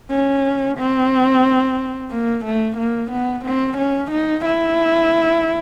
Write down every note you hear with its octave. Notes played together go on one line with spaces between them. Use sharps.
C#4
C4
A#3
A3
A#3
B3
C4
C#4
D#4
E4